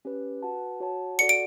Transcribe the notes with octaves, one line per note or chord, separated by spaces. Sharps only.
C#4 G4 B4
F#4 B4 F#5 A5
F#4 C#5 F#5 A5
F#4 A4 D5 F#5 C#7
D7